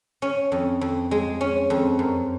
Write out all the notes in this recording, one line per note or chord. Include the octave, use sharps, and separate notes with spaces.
C#4
F2
F2
G#3
C#4
F2
F#2